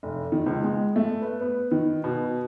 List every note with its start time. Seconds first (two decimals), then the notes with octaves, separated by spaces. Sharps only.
0.03 F1
0.32 D#3
0.46 C#2
0.64 G#3
0.96 A3
1.22 B4
1.41 B3
1.71 D#3
2.04 B2